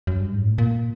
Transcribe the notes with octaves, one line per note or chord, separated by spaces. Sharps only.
F#2
G2
G#2
A2
A#2